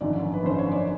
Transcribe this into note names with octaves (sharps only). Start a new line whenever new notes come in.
G#1 F#2 D3 F3 D5
B4
G#1 F#2 D3 F3 C5
C#5
D5